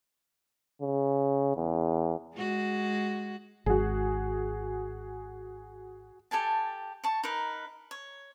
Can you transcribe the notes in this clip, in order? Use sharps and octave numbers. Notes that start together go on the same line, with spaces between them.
C#3
E2
G#3 F#4
G#1 F#4 G#4
G4 A4 G#5 A5
A5 C#6
D#4 A#4 B4
C#5